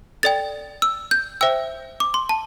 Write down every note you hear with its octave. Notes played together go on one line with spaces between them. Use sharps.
A4 D5 G5 A6
E6
G6
C5 E5 G5 E6
D6
C6
A5